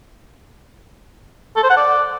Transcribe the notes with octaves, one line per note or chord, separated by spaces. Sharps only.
A4
C5
F#5
D5